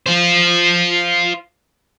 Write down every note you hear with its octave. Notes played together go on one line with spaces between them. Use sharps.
F4 C5